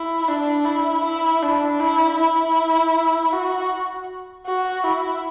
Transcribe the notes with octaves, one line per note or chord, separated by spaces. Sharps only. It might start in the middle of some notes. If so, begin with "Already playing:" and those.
Already playing: E4
D4
E4
E4
D4
E4
E4
F#4
F#4
E4